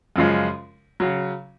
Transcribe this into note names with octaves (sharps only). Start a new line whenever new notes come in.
F#2 C#3 F3 G#3
C#3 F#3